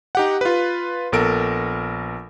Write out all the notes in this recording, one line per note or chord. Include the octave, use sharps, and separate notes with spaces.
D#4 G4 F#5
F4 B4
A#1 B3 A4 A#4 D7